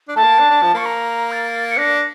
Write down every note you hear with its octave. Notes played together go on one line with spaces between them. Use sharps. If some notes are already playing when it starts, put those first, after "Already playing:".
D4
A3 A5
A#3
D4
D4
F3
A#3 C#6
A#5
A6
C#7
D4 A#6